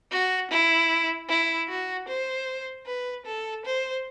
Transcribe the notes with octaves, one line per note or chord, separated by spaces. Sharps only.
F#4
E4
E4
F#4
C5
B4
A4
C5